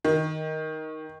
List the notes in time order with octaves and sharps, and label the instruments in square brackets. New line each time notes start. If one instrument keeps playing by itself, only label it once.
[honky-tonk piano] D#3